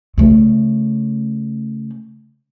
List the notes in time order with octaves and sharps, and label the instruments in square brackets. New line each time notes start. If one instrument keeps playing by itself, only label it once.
[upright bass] C#3 A3